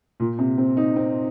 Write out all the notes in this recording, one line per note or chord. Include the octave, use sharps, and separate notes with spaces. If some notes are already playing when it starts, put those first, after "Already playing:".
A#2
C3
C4
D#4
C4